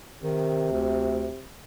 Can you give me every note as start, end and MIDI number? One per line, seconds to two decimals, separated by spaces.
0.23 1.49 48
0.23 0.67 51
0.71 1.29 38